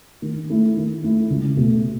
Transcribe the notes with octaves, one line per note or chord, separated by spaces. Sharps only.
D#3
A3 E4
D#3
A3 E4
C#2
B2 A3